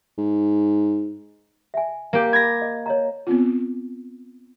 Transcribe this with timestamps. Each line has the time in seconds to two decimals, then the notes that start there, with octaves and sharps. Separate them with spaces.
0.18 G#2
1.74 E5 G#5
2.13 A#3 G4
2.33 B5 G#6 A#6
2.62 D#5
2.86 C#5 D#5 A#5
3.27 B3 C4 F4